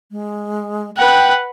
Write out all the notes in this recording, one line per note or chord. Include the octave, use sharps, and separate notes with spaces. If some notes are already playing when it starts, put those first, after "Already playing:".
G#3
B4 F#5 G5